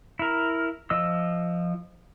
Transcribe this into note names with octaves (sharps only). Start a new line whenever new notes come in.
E4 A#4
F3 D#5 E6